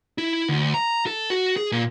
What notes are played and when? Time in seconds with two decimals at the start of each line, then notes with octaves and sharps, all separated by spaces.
0.18 E4
0.49 D2
0.74 A#5
1.06 A4
1.30 F#4
1.56 G#4
1.72 A#2